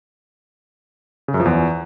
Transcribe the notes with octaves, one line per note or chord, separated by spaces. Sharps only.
C#3
F#2
F3
E2